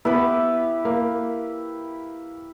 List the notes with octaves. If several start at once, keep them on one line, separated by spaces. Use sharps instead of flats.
B3 E4 G4 B4
A#3